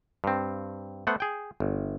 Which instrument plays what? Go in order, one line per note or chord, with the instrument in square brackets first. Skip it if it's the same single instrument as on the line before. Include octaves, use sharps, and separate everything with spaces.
[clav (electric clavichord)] G2 C4
A3 B3 C5 F#5
G#4 G5
G1